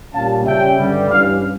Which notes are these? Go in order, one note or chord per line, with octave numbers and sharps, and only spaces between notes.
A#2 G3 C#4 F5 A5
C#3 G3 C#4 E5 G5
G2 D3 G3
G2 E3 G3 C#4 D5 F5